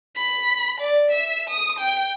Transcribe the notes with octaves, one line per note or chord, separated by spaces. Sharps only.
B5
D5
E5
D#6
G5